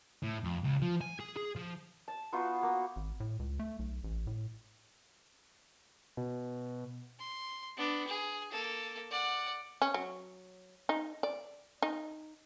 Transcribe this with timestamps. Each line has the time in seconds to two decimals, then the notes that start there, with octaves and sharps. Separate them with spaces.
0.23 A2
0.44 F2
0.64 C#2
0.82 F3
1.01 G#5
1.20 G#4
1.37 G#4
1.56 F3
2.08 A5
2.32 B3 D#4 F4 F#4
2.62 A#3 B3
2.96 G#1
3.20 A2
3.39 C#2
3.59 A3
3.79 B1
4.04 A1
4.27 A2
6.17 B2
7.19 C6
7.77 B3 D4
8.07 G#4
8.51 A#3 A4
9.11 D5 F#5
9.82 C#4
9.94 F#3
10.89 D#4
11.23 D5
11.82 D#4